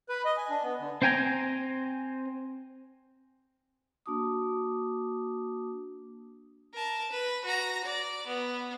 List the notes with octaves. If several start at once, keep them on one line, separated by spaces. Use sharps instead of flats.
B4
D#5
G#5
D4
B3
D3
C4 C5 G5 G#5 A#5
A#3 D4 F#4 A5 D6 D#6
A#4 A5
B4
F#4 A#5
D5
B3